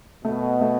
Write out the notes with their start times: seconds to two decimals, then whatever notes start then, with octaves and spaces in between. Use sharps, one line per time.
0.25 B2 A3
0.61 A3